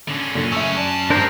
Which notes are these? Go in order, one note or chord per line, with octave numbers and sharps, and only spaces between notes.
D3 C#4
F#2 A#2 D3 C#4
C#3 A3 E5 E6
D3 D5 A5
G2 A3 D4 A#4 C5